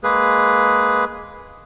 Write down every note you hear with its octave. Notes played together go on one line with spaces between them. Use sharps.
G#3 A#3 G#4 B4